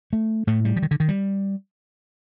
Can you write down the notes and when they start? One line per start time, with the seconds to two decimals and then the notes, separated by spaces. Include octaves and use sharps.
0.13 A3
0.47 A2 A3
0.65 G3
0.76 F3
0.82 D#3
0.91 D3
1.00 D#3
1.09 G3